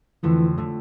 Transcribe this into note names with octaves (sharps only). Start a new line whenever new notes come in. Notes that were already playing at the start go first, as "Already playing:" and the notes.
F2 D3 E3 A3
D3 A3